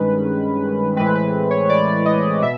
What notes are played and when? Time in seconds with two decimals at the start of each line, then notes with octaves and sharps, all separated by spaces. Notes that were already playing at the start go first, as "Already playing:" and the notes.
Already playing: G2 D#3 G#3 C#4 B4
0.96 A2 E3 G#3 C4 B4
1.15 B4
1.51 C#5
1.69 D5
2.06 D#5
2.42 B2 E5